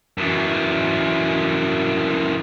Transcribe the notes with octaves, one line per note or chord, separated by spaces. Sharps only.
F#2 E3